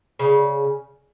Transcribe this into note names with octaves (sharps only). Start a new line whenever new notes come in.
C#3